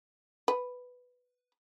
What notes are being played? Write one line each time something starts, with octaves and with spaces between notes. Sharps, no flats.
B4